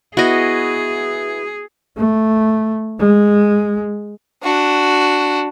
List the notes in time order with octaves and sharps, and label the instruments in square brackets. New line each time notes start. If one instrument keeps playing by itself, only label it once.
[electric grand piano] B3 E4 [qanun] F#4 D#5 [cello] G#4
[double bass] A3
G#3
[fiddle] D4 F#4